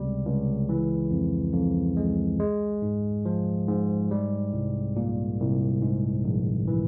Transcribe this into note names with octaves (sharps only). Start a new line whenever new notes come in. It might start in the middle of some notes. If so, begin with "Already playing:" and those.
Already playing: C#2 C3 G3
C#2
E3
F2
F2
G#3
G#3
G#2
F3
G#2
G3
C2
A#2
C2
G#2
A#1
E3